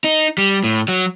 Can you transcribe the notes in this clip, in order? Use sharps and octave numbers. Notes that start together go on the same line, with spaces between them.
D#4
G3
A2
F#3